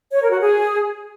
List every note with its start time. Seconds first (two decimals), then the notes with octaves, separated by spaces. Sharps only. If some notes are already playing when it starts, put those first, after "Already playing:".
0.12 C#5
0.21 A#4
0.30 F#4
0.39 G#4